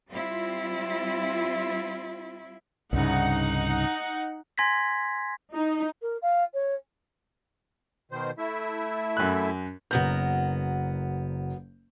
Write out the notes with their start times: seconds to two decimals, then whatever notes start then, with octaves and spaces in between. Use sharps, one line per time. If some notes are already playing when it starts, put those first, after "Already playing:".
0.10 G3 C4 E4 F4
2.93 C2 G2 C#3 D#4 F#5
4.58 G#5 C6 G#6 A#6 B6
5.54 D#4
6.02 A#4
6.22 F5
6.54 C#5
8.12 B2 D#3 C5
8.38 A3 E4 E5
9.17 F#2 F#6
9.91 F#1 F#3 B3 A#4 G6